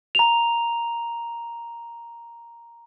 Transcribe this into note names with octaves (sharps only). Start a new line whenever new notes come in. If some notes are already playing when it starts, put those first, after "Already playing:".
A#5 F7